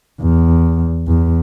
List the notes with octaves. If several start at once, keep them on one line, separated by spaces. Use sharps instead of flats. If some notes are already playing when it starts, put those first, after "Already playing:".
E2
E2